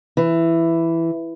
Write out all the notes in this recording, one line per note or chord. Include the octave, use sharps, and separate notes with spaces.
E3